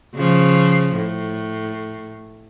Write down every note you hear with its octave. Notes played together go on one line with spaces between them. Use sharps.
C#3 F3
A2